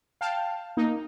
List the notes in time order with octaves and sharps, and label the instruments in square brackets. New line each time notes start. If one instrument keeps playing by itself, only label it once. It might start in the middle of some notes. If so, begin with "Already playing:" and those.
[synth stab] F5 G5 A5
A#3 D#4